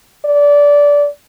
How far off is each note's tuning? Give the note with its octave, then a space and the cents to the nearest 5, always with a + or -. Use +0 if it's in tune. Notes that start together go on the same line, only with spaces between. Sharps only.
D5 -20